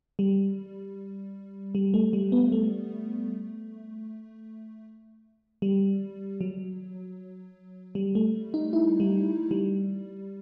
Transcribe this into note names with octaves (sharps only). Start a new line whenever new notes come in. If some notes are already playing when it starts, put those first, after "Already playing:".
G3
G3
A3
G3
B3
A3
G3
F#3
G3
A3
D#4
E4
G3
G3